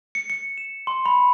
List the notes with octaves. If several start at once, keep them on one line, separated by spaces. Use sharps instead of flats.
C#7
C#7
E7
C6
B5